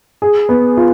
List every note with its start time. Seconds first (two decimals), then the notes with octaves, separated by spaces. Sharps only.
0.22 G#4
0.49 B3
0.77 F4